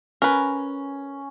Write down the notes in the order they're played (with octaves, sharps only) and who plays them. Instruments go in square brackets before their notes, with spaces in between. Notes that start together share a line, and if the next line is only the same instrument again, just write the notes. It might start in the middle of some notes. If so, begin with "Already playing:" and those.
[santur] C#4 [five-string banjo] A#4 B4